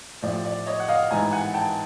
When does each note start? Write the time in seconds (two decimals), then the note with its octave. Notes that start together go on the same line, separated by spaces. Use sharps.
0.22 A1 A2 F3 D5
0.45 D5
0.66 C#5 D#5
0.80 F#5
0.89 D#5 F5
1.11 A1 G#2 E3 G#5 A#5
1.32 F#5 G#5
1.54 G5 A5